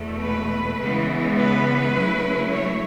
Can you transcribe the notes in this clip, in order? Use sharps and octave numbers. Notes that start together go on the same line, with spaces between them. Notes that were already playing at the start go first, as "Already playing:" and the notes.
Already playing: E2 B2 A3
B4
C#3 E3 G#3 B3
B4
C#3 F#3 A3 E4
C#5